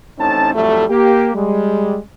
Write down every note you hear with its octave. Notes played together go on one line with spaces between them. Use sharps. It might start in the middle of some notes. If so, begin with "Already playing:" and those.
A1 A2 C4 C#4 D#4 A5
F2 A2 F#3 G3 A3
A#3 G4
G3 G#3